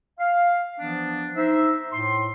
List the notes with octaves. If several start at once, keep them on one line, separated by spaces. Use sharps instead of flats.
F5
E3 F3 B3 D4
D#4 C5 E5
A2 C6